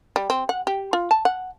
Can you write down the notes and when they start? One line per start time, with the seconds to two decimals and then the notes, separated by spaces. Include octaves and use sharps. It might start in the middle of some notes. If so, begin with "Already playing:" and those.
0.16 G3
0.30 C4
0.49 F#5
0.67 G4
0.93 F4
1.11 A5
1.25 F#5